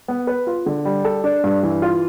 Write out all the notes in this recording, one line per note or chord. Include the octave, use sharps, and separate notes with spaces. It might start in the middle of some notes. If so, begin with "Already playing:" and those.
B3
B4
F4
D3
G3
A4
D4
G2
E3
F4